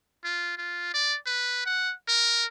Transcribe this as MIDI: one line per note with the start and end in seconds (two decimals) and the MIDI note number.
0.24 0.55 65
0.57 0.93 65
0.94 1.16 74
1.26 1.66 71
1.66 1.93 78
2.08 2.45 70